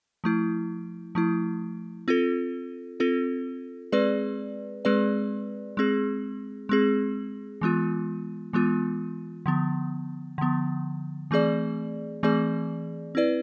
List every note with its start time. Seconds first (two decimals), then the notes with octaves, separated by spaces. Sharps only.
0.24 F3 A3 E4
1.15 F3 A3 E4
2.08 C4 F4 A4
3.00 C4 F4 A4
3.92 G#3 C4 G#4 B4 D5
4.85 G#3 C4 G#4 B4 D5
5.77 G#3 C4 G#4
6.69 G#3 C4 G#4
7.61 E3 G#3 B3 F4
8.53 E3 G#3 B3 F4
9.46 D3 F3 B3
10.38 D3 F3 B3
11.31 E3 A3 C4 G#4 D5
12.23 E3 A3 C4 G#4 D5
13.15 C4 E4 B4 D5